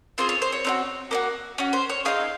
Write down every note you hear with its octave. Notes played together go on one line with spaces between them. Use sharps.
C4 F4 G#4 C5
C#5
C5
C#5
C4 D#4 F#4
A#3 D#4 F#4
C#4 F#4
C5
C#5
C4 D#4 G#4 F5